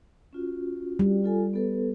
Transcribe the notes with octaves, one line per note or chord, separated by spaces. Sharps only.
C#4 F4 F#4
G3
F4 A4 G#5
B3 A4 B4